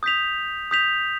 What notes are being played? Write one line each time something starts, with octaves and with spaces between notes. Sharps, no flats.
D#6 G6 B6 F7
D#6 G6 B6 F7